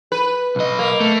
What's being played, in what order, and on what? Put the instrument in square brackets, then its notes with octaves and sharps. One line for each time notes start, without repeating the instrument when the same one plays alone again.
[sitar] B4
[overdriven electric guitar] B1 D#5
[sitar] A#3
[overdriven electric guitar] A3